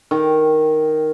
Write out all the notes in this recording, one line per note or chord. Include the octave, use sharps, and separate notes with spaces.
D#3